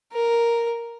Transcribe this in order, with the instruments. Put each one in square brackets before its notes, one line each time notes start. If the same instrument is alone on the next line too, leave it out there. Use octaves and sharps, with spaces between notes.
[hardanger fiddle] A#4